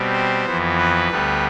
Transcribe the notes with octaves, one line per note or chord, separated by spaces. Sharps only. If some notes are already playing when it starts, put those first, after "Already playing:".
Already playing: B2 G3 C4
C5
F2 E3 B3
B4
D2 D3 G3 B3